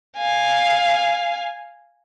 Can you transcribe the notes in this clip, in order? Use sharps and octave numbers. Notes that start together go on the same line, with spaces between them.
F5 G#5